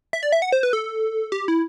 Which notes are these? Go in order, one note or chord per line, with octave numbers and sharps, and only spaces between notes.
E5
D5
E5
F#5
C5
B4
A4
G4
E4